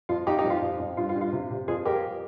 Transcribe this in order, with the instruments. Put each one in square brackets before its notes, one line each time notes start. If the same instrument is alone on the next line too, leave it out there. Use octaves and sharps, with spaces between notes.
[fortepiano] F2 F4
F2 D#4 G4
D#4 G4
F2
F4
F2
F2
G2 F4
F4
G2
F4
C3
C3
F2 F4 G#4
F2 G4 A#4